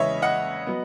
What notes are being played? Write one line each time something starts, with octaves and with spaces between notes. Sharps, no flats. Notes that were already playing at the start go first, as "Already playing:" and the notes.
Already playing: E2 C#3 G#3 B4 C#5 D#5 E5
D#5 F#5
F#3 B3